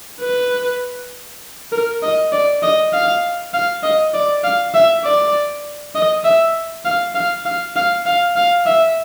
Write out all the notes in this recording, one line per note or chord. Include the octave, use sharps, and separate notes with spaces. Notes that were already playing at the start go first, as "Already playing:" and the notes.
B4
A#4
D#5
D5
D#5
F5
F5
D#5
D5
F5
E5
D5
D#5
E5
F5
F5
F5
F5
F5
F5
E5